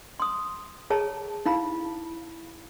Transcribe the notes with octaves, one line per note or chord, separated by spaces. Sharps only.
C6 D#6
G#4 C#5 A5 A#5
D#4 E4 F5 B5